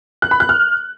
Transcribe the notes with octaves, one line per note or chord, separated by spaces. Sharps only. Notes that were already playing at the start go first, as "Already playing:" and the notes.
F#6
B5
F#6
F6